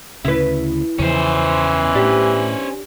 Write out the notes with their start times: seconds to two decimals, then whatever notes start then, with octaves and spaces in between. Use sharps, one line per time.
0.25 D2 C#3 E4 B4
0.99 E2 C#3 E3 F3 C#4 C5
1.95 A2 D4 G4